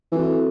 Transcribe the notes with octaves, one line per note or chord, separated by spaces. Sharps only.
E3 C4 F#4 A4